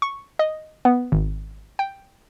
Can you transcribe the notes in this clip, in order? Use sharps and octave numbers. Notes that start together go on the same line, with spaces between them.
C#6
D#5
B3
G#1
G5